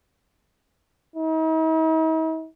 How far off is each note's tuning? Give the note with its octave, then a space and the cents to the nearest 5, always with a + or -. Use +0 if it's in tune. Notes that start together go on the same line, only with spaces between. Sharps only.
D#4 +45